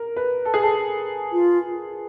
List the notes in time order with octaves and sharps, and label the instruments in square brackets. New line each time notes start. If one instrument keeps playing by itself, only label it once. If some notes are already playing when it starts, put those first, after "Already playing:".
Already playing: [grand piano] A#4
B4
A4
G#4
A4
[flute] F4